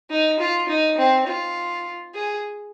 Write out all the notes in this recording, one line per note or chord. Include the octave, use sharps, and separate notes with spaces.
D#4
F4
D#4
C4
F4
G#4